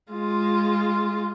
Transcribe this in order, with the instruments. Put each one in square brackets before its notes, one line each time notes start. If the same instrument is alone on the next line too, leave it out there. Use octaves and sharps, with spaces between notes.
[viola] G#3 F4